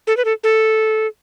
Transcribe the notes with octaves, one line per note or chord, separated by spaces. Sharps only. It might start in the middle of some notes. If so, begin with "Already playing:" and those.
A4
B4
A4
A4